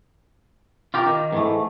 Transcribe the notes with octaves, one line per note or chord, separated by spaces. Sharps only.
F4 G4 A#4
D#3
G#2 E3 A3